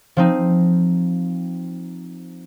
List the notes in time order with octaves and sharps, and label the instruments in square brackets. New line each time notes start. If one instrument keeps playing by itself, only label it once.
[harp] F3 C4 D#4